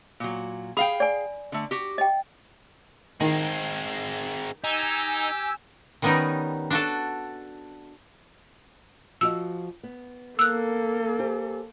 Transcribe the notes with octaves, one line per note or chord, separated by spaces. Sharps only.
A#2 F#3
G#4 F5 G5 B5
D5 G#5
D3 A3
F#4 G4
D#5 G5
D#3 G#3 C4
D#4 G4 G#5 E6
D#3 G3 B3 C#4 D#4
D4 F#4 A4
F3 F#4 D#5 E6
B3
A#3 A4 E6 F#6
G4 C5 G#5